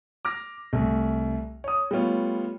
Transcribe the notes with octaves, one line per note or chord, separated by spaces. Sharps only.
D6 F6 A#6
C2 A3
C#5 D#6
G3 A3 B3 F4 C#5